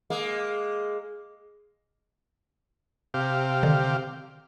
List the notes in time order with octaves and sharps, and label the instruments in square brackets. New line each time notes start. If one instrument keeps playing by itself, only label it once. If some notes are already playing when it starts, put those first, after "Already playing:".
[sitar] G#3 A#3
[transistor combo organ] C3 G4 F5
[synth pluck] D3 D#3